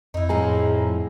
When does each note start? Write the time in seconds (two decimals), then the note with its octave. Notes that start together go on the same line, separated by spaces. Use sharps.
0.14 F2 D#4 E4
0.29 A2 F3 G#4 G#5 A#5